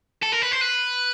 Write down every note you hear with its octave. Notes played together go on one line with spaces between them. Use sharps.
A4
A#4
B4
C5
B4